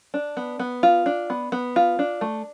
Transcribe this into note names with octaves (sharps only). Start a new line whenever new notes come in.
D4
B3
B3
F4
D4
B3
B3
F4
D4
A3